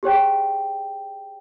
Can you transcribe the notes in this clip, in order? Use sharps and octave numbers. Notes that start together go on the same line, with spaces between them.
G4 G#4 C#5 G5